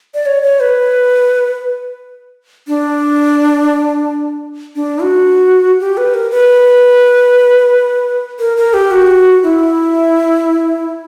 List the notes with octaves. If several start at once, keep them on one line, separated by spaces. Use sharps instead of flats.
D5
C#5
C#5
B4
D4
D4
F#4
G4
B4
A#4
B4
A#4
A#4
G4
F#4
E4